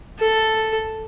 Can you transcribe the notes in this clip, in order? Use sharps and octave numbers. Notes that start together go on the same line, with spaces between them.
A4